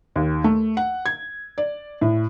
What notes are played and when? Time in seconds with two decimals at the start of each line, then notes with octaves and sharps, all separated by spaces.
0.16 D#2
0.44 A3
0.77 F#5
1.06 G#6
1.58 D5
2.01 A2